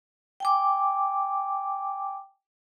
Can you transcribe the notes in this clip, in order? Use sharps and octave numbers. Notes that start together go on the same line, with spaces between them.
G5 G#5 D6